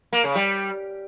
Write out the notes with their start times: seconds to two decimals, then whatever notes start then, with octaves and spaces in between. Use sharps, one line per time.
0.13 A#3
0.24 C#3
0.35 G3